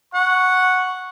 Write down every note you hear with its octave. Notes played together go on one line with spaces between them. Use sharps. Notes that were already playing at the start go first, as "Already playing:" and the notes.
F#5 C#6